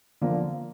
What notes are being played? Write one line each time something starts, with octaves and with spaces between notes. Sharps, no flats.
D3 F3 A#3